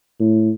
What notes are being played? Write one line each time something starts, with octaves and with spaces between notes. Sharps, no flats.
A2